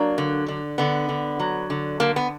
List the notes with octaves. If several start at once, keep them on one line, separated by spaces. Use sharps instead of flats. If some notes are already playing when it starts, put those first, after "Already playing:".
Already playing: F#3 A#3 D4
D3
D3
D3 B3
D3
F#3
D3
D3 A#3
B3